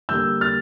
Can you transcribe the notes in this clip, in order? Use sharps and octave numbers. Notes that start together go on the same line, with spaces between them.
D3 G3 A#3 E6 G6
F6 A6